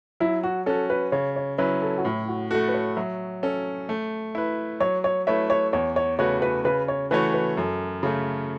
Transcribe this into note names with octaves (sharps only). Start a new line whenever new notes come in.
F#3 E4
F#4
C#4 F#4 A4
B4
C#3 C#5
C#5
F#3 C#4 E4 B4 C#5
A4
F#4
A2 E4
F#4
A3 F#4 A4
B4
C#5
F#3 E5
C#4 A4
A3
E4 B4
F#3 C#5
C#5
A3 E4 B4 C#5 E5
C#5
E2 C#5
C#5
C#3 A3 F#4 B4 C#5
B4
C#3 B4
C#5
E3 A3 F#4 B4 C#5
B4
F#2 A4
C#3 A3